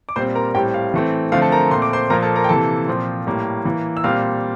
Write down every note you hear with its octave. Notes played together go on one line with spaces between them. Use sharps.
D6
A#2 G3 C4 C5 C6
A#4 A#5
A2 G3 C4 G4 G5
F5
E3 A3 C4
D3 F3 A3 C4 F5
A4 A5
A#4 A#5
A#2 A3 C4 C6
D6
C5 C6
A#2 F3 A#3 A#4 A#5
A4 A5
A#4 A#5
G5
C3 E3 A#3 A4 A5
A#2 F3 C4
A2 G3 A#3
E3 A#3
E6
A#2 G3 C4 F5 F6